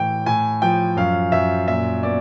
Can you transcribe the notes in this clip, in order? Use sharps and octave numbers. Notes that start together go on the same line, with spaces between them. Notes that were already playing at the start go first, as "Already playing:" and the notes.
Already playing: A2 E3 G5
A2 G#5
F3 G5
F#2 F5
F#2 E5
A#2 E5
B3 D5